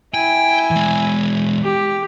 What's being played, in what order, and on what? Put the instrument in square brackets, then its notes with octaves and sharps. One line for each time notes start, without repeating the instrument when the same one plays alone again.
[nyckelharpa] E4 G#5 [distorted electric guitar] G5
[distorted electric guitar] E3 G#3
[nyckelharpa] G4